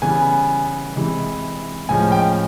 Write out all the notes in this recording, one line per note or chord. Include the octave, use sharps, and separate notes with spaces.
C#3 E3 G3 B3 G#5
C3 E3 G#3
A2 F3 G#3 C#4 G#5
G5